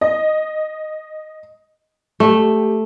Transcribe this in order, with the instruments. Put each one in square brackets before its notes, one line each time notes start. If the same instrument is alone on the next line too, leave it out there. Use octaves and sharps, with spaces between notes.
[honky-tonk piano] D#5
[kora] A3 [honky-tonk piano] G4